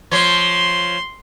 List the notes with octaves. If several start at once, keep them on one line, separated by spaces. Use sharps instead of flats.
F3 C#5 C6